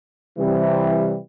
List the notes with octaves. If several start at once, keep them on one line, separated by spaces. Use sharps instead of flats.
C3 E3 G3